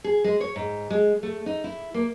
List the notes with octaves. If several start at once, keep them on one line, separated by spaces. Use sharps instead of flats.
G#4
G#3
C#5
G#2
G#3
A3
D#4
E4
A#3